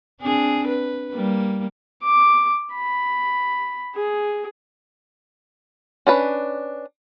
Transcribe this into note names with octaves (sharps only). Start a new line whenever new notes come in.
C4 D4 G#4
B4
G3 A#3
D6
B5
G#4
C#4 D4 B4